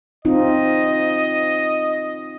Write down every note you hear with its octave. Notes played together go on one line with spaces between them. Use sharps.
C4 D#4 F4 D#5